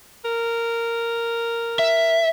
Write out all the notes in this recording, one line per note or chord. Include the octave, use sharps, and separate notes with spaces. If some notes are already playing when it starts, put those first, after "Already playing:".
A#4
E5